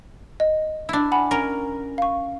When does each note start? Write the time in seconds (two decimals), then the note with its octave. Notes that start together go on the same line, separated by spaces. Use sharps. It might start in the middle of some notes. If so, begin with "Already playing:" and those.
0.40 D#5
0.89 D4 E4
1.12 F#5 G#5 B5
1.31 C#4 A#4
1.98 F5 C#6